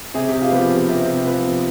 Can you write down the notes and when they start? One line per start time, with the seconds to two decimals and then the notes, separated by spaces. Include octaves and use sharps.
0.14 C3 G#4
0.28 G4
0.42 F4
0.52 F3 B3 G4
0.88 C3
1.26 F3 B3